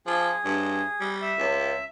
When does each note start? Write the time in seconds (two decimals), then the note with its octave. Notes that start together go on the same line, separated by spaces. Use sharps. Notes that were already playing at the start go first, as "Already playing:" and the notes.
0.06 F3 G#4
0.44 G2
1.00 G3
1.22 E5
1.38 C#2